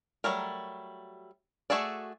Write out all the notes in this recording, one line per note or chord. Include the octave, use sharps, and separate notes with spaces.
F#3 G3 A3 A#4
A3 F#4 G#4 A4 D5